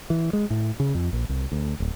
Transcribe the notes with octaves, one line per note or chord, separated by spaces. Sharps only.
E3
G#3
A2
C#3
F2
A#1
C2
D2
D1